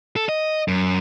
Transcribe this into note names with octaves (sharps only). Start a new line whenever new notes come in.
A4
D#5
F#2